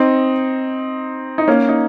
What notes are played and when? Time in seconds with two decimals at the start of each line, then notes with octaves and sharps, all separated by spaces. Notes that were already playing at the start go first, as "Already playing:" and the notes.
Already playing: C4 D#4
1.38 D#4
1.48 A#3 C#4
1.69 D#4